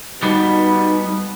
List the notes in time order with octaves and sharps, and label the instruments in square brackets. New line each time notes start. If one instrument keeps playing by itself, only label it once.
[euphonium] B2 [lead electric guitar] G3 B3 [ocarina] D#4